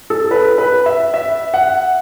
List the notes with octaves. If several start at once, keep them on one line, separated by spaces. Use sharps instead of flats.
A4
B4
B4
E5
E5
F#5